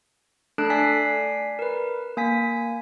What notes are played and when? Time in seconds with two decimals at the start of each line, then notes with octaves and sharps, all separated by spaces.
0.58 A3 D4 A4 A5 F#6
0.70 D5 G#5 B6 C7
1.59 A#4 B4
2.17 A#3 G#5 B6